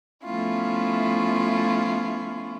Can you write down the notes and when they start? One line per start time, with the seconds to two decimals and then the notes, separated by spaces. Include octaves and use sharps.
0.25 F3 A3 B3 C#4 E4 F4